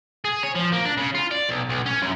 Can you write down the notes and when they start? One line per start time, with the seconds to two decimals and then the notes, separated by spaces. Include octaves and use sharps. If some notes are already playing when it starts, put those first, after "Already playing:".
0.25 G#4
0.43 C#5
0.55 F3
0.72 A#3
0.85 D4
0.98 C#3
1.15 F4
1.31 D5
1.49 B1
1.69 B1
1.86 C#4
2.02 F#2